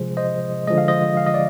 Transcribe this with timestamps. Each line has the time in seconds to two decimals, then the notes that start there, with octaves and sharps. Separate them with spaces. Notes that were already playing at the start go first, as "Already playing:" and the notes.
Already playing: C3 F3 G#3 G#4 C5
0.17 C5 D#5
0.67 D3 F3 G#3 D#5
0.78 F5
0.88 C5 D#5
1.17 F5
1.26 D#5
1.34 D5